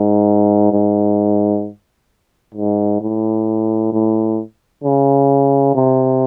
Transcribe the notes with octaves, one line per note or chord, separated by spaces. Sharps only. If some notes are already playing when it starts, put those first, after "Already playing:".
Already playing: G#2
G#2
G#2
A2
A2
C#3
C3